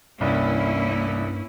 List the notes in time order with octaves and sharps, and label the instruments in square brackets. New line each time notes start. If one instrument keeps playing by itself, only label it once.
[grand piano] C2 [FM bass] G2 [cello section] A#3 C#4 E4